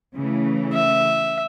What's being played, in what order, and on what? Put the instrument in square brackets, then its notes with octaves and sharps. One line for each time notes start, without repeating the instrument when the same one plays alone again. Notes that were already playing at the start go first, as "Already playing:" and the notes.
[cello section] C#3 E3 A3
[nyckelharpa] E5